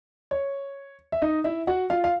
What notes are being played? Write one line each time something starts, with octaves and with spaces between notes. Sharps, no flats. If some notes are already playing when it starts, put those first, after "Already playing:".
C#5
E5
D#4 D#5
E4 E5
F#4 F#5
F4 F5
F5